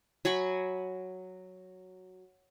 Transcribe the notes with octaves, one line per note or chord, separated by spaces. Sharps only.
F#3 G#5 B5 C#6